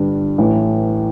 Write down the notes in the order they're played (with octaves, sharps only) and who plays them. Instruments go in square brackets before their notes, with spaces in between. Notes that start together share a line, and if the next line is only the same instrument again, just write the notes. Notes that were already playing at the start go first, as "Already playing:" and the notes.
Already playing: [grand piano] G1 G2 G3 D4
A1 A2 E3